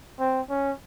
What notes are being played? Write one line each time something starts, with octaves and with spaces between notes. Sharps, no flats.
C4
C#4